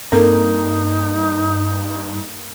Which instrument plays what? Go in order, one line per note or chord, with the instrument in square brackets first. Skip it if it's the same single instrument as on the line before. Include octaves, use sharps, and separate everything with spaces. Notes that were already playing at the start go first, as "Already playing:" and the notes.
[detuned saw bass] G2 [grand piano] A#3 [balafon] C4 A4 A#4 [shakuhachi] D#4